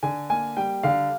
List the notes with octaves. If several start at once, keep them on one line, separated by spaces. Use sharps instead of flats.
D3 G#5
A#3 G#5
G3 G5
D3 F5